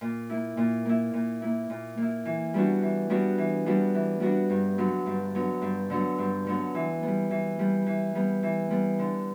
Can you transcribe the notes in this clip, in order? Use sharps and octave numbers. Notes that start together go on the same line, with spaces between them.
A#2
A#3 E4
A#2
A#3 E4
A#2
A#3 E4
A#2
A#3 E4
E3
G3 B3 D4 F#4
E3
G3 B3 D4 F#4
E3
G3 B3 D4 F#4
E3
G3 B3 D4 F#4
G2
D3 F#3 B3
G2
D3 F#3 B3
G2
D3 F#3 B3
G2
D3 F#3 B3
E3
G3 B3
E3
G3 B3
E3
G3 B3
E3
G3 B3
D3